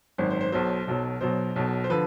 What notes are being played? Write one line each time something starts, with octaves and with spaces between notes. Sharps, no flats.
G#1 F#2 D#3 C5
C5
C5
B1 B2 F#3 C5
B1 B2 F#3
B1 B2 F#3 C5
B1 B2 F#3
C5
D3 F3 B4